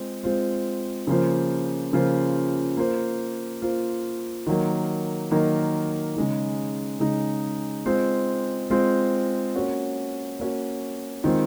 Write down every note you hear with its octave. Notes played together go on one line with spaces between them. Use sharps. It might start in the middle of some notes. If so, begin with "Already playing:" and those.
Already playing: G#3 C4 F4 C5
G#3 C4 F4 C5
C#3 F3 A#3 F4 C5
C#3 F3 A#3 F4 C5
A#3 F4 C5
A#3 F4 C5
D#3 F#3 A#3
D#3 F#3 A#3
C#3 G#3 D#4
C#3 G#3 D#4
G#3 C4 F4 C5
G#3 C4 F4 C5
A#3 C#4 F#4
A#3 C#4 F#4
D#3 G#3 C4 F4